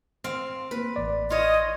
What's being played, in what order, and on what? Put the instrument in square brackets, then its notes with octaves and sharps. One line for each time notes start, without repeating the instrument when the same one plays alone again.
[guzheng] C4 F5
[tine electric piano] A#3 [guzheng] B4
[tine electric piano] A1 D5
[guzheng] F4 C#5 [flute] D#5